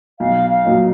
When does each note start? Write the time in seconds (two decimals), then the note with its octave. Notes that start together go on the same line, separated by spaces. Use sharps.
0.20 B1 F5
0.50 F5
0.65 A#2 F#3 A#3 D#4